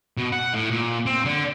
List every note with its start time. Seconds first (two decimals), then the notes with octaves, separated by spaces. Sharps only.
0.17 B2
0.32 F#5
0.53 A2
0.71 A#2
1.06 C4
1.25 D3